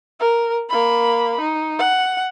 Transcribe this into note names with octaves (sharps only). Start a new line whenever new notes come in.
A#4
A#3 B5
D#4
F#5